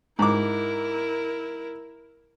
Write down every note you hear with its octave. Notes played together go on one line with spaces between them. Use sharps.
G#2 E4 A#4 D6